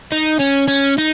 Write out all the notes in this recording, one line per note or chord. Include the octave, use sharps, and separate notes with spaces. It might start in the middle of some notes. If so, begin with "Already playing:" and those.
D#4
C#4
C#4
D#4